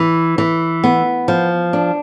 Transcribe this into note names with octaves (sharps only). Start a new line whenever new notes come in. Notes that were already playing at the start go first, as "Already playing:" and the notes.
Already playing: E3
E3
B3
F3
D4